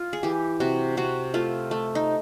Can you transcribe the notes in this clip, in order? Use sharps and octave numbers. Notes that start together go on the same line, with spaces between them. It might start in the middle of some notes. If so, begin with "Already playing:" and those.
Already playing: F4
G#4
E3 G4
C3 F#4
C3 F#4
A3 F4
A3
D#4